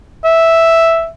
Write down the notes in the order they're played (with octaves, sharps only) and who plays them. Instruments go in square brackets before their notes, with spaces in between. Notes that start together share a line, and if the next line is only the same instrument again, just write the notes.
[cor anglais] E5